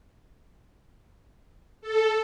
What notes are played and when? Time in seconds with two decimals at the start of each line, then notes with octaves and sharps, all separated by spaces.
1.81 A4